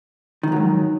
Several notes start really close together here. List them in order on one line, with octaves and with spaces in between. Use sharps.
D#3 F2 F#3 G#2